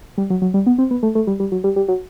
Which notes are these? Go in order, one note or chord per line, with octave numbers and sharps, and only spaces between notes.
G3
F#3
F#3
G3
B3
C4
B3
A3
A3
G3
G3
F#3
G3
G3
F#3